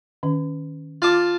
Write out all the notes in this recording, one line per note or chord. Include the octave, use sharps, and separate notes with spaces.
D#3 C#4
F4 A5 D6